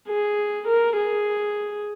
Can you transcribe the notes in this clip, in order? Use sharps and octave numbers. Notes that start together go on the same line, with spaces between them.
G#4
A#4
G#4